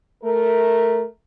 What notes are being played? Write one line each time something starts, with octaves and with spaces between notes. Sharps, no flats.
A3 A#4